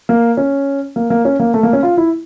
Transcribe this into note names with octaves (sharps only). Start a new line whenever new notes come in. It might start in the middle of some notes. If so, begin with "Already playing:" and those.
A#3
C#4
A#3
A#3
C#4
A#3
A3
A#3
C#4
F4
E4